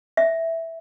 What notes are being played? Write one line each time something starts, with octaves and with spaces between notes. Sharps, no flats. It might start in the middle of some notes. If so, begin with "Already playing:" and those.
E5